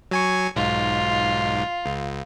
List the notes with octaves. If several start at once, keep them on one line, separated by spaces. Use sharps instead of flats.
F#3 G#5 C#6
B1 G#2 F4
C#2